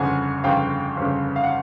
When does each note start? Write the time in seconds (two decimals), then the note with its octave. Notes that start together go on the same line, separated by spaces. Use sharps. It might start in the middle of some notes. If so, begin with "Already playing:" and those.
Already playing: G1 F2 C#3 F#5 G#5
0.44 G1 F2 C#3 F5 G5
0.97 G1 F2 C#3
1.36 F5
1.43 F#5